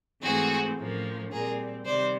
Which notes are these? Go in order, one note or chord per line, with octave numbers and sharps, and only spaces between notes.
G#2 E3 A3 C4 F#4 G#4
A2 F3 A#3 C#4
A#2 G3 C4 G#4 A#4
C3 D#3 G3 C5 D5